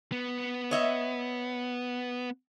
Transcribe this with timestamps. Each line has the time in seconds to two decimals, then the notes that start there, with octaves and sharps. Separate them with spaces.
0.12 B3
0.71 C#5 D#5 E5